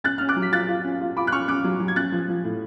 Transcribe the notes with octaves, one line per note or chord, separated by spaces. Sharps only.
C#4 F#6 A6
C#4 F6
D6 F#6
F#3
B6
F4 F#6 A6
F4
C#4
F4
F4 B5 D6
F#6
C#4 C#6 F6
C#4 D6 F#6
F#3
F#3
G#6
C#4 F#6 A6
F3
F3
A2